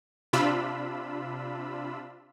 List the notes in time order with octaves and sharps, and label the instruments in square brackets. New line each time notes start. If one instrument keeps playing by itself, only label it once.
[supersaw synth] C3 D4 F4 B5 E6